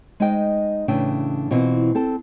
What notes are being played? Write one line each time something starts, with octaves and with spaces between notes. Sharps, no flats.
G#3 D#4 C5 D#5 G5
A2 C#3 E3 D4 E5 G5
B2 E3 C4 F4
C4 A4 A5